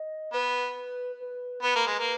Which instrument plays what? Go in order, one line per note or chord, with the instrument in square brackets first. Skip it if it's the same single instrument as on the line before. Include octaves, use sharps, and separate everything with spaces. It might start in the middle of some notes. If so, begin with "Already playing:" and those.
Already playing: [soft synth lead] D#5
[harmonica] B3 [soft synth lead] B4
[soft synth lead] B4
[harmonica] B3 [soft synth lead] B4
[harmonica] A#3
G#3
A#3